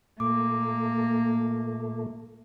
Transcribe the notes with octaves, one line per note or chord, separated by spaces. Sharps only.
A#2 A3 A#3 D6